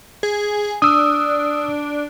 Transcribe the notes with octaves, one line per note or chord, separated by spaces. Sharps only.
G#4
D4 D#6 E6